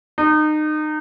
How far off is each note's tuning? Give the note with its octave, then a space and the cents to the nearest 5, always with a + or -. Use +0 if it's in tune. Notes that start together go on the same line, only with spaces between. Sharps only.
D#4 -30